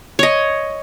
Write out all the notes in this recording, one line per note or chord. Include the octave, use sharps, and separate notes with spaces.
C#5 D#5